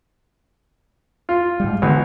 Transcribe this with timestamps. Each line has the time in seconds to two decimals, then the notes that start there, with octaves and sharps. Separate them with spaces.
1.29 F4
1.60 G#2 G3
1.82 B1 D3 E3 G#3